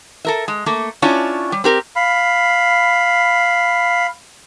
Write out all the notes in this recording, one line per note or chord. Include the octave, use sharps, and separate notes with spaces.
A4 A#4 E5
G#3
A3 A#3
C#4 D4 E4 F4 C#5
G3
C4 G4 A#4
F5 B5